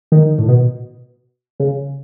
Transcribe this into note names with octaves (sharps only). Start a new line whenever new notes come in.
D#3
A2
B2
C#3